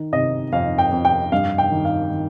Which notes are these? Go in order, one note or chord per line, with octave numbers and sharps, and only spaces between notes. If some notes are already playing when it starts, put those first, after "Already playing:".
Already playing: D#3
C3 D#5
F2 F5
G5
F2
G5
G2 F5
G5
D#3
F5
D#3